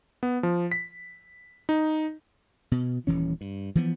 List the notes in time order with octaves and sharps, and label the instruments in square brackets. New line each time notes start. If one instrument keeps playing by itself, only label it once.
[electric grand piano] B3
F3
B6
D#4
[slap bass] B2
D#1 E3 C#4
G2
E3 F3 B3